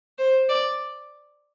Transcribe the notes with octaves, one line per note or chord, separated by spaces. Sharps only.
C5
D5